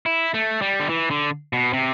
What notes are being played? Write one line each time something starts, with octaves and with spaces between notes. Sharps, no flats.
E4
A3
G3
D3
E3
D3
B2
C3